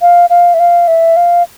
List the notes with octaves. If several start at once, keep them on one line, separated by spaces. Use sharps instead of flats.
F5
F5
E5
F5
E5
F5